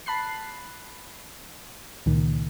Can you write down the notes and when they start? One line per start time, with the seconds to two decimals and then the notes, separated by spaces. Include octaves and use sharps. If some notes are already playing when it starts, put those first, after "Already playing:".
0.06 A5 B5 F#6 C7
2.06 C#2 A#2 D#3